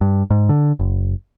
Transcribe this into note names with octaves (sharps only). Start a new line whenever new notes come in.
G2
G#2
D3
F#1